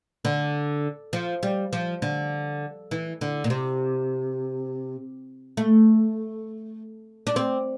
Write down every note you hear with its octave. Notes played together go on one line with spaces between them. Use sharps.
D3
F3
G3
F3
D3
E3
D3
A#2
C3
A3
D4
C4